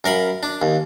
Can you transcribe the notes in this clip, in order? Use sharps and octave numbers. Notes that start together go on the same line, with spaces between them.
F#2 A#4 F5 B5
D4
D#2